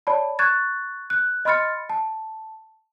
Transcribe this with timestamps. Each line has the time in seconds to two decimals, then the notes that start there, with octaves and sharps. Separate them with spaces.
0.07 C#5 D5 A5 B5
0.39 C#6 F#6 G#6 A6
1.10 F#6
1.45 D#5 B5 C6 F6 A6 C#7
1.90 A5